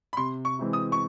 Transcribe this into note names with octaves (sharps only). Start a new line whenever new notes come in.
B5
C3 C6
C#6
E3 G#3 C4 E4
D#6
C#6